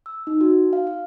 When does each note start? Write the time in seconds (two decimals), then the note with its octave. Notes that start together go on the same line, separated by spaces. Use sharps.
0.06 E6
0.27 D#4
0.41 F#4
0.73 F5
0.87 F5